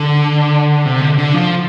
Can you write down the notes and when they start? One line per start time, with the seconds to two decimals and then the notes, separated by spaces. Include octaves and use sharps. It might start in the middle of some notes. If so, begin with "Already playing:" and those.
Already playing: D3
0.86 C3
1.02 D3
1.18 D3
1.34 F3